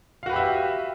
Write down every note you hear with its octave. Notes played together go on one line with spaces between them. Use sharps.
F#4 G4 B4 E5 F5